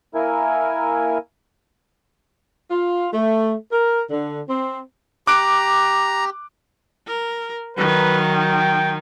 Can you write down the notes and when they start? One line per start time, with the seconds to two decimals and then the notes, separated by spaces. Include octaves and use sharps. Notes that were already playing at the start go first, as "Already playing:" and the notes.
0.15 A#3 E4 A#4 G#5
2.71 F4
3.13 A3
3.72 A#4
4.10 D3
4.47 C4
5.27 G4 A#5 D6 F#6 D7
7.07 A#4
7.77 D#3 F#3 B4
8.33 G5